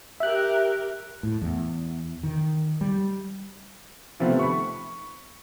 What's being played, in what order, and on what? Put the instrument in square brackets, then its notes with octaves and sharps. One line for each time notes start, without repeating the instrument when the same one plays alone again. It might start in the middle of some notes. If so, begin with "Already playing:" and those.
[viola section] G4 A#4 [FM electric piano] E5 F#6
[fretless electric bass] A2
E2
D#3
G3
[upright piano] C3 D#3 F3 A3 B3 G4
B5 C#6